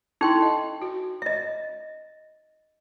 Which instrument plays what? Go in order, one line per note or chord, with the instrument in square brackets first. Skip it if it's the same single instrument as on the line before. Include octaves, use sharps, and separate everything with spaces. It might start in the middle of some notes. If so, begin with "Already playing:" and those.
[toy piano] D#4 G5 C6 [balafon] E4 A4 C#6
[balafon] D#5
F#4
[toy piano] D#5 E5